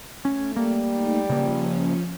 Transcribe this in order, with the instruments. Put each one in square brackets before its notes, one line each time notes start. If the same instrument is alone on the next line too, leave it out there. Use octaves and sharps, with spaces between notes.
[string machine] A3 [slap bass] C#4
[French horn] G3 [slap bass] A#3
[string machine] A3 D#4
[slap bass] C#3 A#3 [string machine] F3 C#4